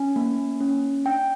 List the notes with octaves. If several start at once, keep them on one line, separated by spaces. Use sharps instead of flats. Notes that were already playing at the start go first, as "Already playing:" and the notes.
Already playing: C#4 G#5
A#3
C#4
D4 G5